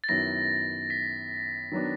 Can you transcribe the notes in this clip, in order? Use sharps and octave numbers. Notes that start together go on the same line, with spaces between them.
A6
F#2 D#3 F#3 B3 E4 A#6
B6
D#3 F#3 B3 D4